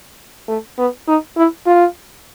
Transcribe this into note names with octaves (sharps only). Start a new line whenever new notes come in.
A3
B3
D#4
E4
F4